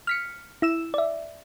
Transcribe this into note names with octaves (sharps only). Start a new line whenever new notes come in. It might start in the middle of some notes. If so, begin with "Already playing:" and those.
F6 B6 C#7
E4 E6 E7
D5 E5